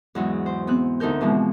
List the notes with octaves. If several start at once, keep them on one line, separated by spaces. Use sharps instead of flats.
E2 G#2 F#3
C5
B3 C4 F#6
D2 D#4 A4 A#4 G6
B2 E3 F3 G#3